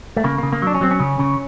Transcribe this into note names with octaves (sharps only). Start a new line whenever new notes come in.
A3
C#3 A#3
C#3 A#3
A#3
F#3 D4
C#4
F#3 C4
C#4
C#3
C#3